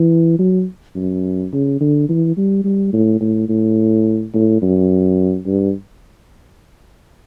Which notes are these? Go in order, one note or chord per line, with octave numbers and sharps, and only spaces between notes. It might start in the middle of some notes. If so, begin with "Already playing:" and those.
Already playing: E3
F#3
F#2
C#3
D3
E3
G3
G3
A2
A2
A2
A2
F#2
G2